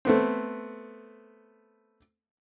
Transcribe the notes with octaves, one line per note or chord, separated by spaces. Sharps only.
A3 B3 C4